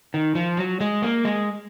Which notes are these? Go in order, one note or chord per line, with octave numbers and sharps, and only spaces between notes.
D#3
F3
F#3
G#3
A#3
G#3